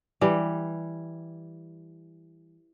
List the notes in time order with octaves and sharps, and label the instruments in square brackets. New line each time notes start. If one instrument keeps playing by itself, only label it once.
[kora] E3 G3